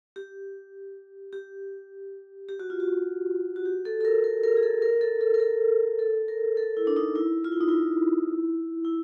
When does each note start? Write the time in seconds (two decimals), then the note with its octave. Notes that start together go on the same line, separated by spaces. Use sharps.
0.16 G4
1.33 G4
2.49 G4
2.59 F#4
2.70 F4
2.80 F#4
3.56 F#4
3.65 G4
3.85 A4
4.01 A4
4.05 A#4
4.24 A#4
4.43 A#4
4.57 G#4
4.63 A4
4.82 A#4
5.01 A4
5.21 A4
5.34 A#4
5.40 A4
5.99 A4
6.28 A#4
6.57 A4
6.77 E4
6.87 D4
6.97 D#4
7.16 E4
7.44 F4
7.52 E4
7.61 D#4
7.69 E4
8.85 E4